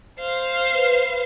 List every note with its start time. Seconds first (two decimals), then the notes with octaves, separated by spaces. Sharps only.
0.20 C5 F5
0.75 B4